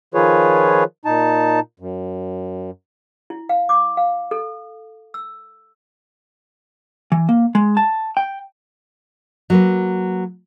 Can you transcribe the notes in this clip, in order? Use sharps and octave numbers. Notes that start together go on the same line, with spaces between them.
D#3 F3 F4 G#4 B4 C#5
A#2 D#4 A5
F#2
E4
F5
D6
F5
A4
E6
E3
A#3
G#3
A5
G5
F#3 A#3 B4